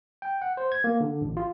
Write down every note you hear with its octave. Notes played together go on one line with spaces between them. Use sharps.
G5
F#5
C5
G#6
A#3
D3
A1
F4